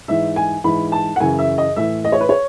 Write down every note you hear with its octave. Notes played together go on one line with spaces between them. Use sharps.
G#2 E3 E5
G#5
G#2 E3 B5
A5
F#5
F#2 C#3 E3 G#5
E5
D#5
A2 E3 E5
D#5
C#5
B4
C#5